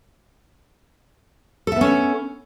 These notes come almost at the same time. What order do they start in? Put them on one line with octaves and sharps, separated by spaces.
A4 E5 B3 C#4